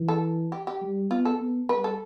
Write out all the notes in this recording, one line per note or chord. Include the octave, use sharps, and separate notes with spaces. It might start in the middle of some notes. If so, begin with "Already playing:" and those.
Already playing: E3
A4
G4
G4
G3
B3 F4
A4
B3
G3 B4
A4